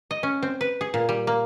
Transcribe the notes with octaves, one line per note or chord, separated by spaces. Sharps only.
D#5
C#4
C4
B4
G#4
A#2
G3
A#3